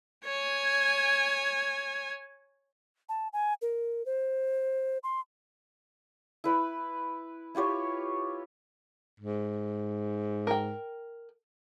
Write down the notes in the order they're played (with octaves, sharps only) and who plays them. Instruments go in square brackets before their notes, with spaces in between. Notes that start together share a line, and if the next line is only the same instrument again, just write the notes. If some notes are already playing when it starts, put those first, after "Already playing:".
[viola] C#5 G#5
[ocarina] A5
G#5
A#4
C5
C6
[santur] E4 B4 B5
E4 F4 G4 C#5
[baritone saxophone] G#2
[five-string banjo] A#4 G5